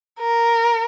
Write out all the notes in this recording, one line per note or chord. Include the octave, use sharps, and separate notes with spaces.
A#4